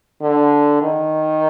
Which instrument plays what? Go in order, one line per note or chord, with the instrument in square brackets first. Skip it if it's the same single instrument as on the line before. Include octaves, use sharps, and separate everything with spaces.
[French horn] D3
D#3